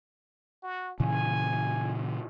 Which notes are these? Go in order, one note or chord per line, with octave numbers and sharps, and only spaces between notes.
F#4
A#2 C#3 E3 G#5